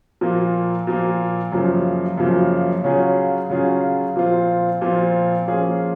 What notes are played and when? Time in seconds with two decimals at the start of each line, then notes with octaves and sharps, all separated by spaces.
0.21 A#2 F3 A#3
0.87 A#2 F3 A#3
1.52 F#2 C#3 F3 A#3
2.18 F#2 C#3 F3 A#3
2.84 C#3 F#3 C#4 F4 G#4
3.50 C#3 F#3 C#4 F4 G#4
4.16 A#2 F3 C4 F4
4.81 A#2 F3 C4 F4
5.47 F3 A#3 C#4 F4 G#4